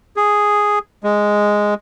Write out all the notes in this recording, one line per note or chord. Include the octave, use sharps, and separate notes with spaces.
G#4
G#3